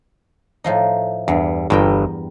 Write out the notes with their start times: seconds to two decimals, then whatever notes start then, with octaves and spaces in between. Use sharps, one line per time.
0.64 A2 F3 D#4
1.28 E2 G2
1.70 G1 E2 G2 A#4 G5